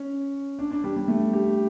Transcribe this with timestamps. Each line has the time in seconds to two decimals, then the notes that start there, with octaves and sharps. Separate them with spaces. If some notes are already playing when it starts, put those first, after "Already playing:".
Already playing: C#4
0.59 D4
0.71 D4
0.84 G3
0.96 G3
1.08 A3
1.33 G4